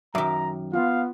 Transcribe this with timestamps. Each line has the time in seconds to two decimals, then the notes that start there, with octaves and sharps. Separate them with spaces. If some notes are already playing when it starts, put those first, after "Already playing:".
0.15 F#2 D#3 E5 A#5 D6
0.73 B3 F4 F5